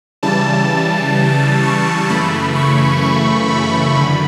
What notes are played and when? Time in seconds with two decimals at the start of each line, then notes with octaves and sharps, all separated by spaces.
0.23 C#3 E3 G3 A5
1.63 C#6
2.09 F#2 C#3 E3 A3 B5
2.56 C#6
3.03 C#6
3.48 B5
3.95 F#2 D3 B5